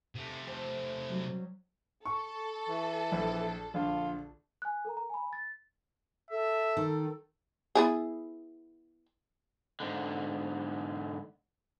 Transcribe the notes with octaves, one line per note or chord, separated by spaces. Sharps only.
C3 A3
C4
F#3 G3
A4 C#6
E3
A#1
A#1 D3 F4
G#5 F#6
A4 A#4 A#5
A#5
G#5 B5
A6
A4 E5
D#3
B3 E4 G#4
G#2 D3